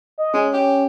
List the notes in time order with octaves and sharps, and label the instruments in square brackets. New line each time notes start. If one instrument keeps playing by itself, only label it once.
[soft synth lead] D#5
[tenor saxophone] G#3 [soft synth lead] C#4
[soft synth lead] C#4 [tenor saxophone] G4